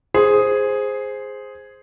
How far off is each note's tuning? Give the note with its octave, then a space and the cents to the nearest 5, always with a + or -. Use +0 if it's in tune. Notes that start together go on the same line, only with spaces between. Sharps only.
G#4 +0 C5 +0